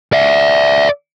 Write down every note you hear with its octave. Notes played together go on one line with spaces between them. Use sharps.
D5 E5